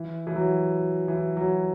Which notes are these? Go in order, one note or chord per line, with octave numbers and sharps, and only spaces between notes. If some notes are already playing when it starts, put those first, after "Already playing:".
Already playing: E3
E3
F#3
E3
F#3